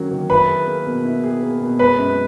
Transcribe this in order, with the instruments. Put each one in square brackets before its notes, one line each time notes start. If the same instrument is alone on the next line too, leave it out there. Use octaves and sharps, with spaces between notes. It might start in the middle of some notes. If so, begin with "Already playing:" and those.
Already playing: [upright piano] D#3 F#3 A#3 C#4
D#3
[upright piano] E4 [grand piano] B4 B5
[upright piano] G#4
A#3
B2
E4
G#4
A#3
B2
[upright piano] G#3 [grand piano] B4 B5
[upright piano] F#2